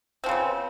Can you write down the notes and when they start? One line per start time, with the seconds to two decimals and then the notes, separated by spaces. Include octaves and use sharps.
0.24 C4
0.26 F3
0.29 C#3
0.31 B3